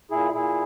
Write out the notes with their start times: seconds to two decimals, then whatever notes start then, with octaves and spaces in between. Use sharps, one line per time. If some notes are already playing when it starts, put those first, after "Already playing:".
0.11 A#2 E4 G#4
0.34 A#2 E4 G#4